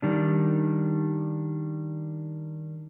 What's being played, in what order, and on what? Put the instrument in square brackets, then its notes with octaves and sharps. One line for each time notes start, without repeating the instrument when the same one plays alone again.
[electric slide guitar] D#3 G3 D4